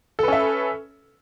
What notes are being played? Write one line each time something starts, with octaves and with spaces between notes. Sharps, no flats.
C#4 A4 B4 E5